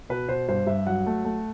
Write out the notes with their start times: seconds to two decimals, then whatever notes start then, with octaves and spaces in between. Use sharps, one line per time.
0.09 B2 B4
0.29 B2 C5
0.48 G2 C5
0.67 G2 E5
0.87 F#3 F#5
1.06 A3
1.25 A3